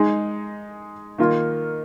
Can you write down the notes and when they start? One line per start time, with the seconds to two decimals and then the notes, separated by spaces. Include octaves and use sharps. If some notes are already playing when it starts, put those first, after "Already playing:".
Already playing: G#3 D#4 G#4
1.18 D#3 A#3 F4 A#4